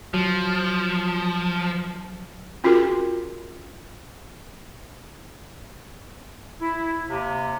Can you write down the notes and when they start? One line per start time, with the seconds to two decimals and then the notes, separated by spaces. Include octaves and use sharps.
0.14 F3 F#3
2.64 C#4 F4 F#4 G#4 A#4
6.61 E4
7.07 D#2 C3